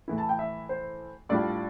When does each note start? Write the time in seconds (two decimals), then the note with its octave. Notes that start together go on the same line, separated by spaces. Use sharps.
0.08 A2 E3 A3 E4
0.18 A5
0.29 G5
0.39 E5
0.69 C5
1.29 A2 G3 D4 F4 D5